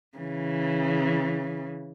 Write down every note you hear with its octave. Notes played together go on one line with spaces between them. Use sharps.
C#3 E3